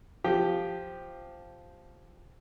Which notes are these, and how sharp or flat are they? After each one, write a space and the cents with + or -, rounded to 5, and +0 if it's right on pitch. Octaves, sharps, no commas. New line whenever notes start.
F3 +0 G4 +0